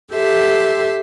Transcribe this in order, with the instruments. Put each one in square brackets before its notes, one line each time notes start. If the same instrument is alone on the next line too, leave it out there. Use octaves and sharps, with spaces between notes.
[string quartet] G4 A4 E5 C6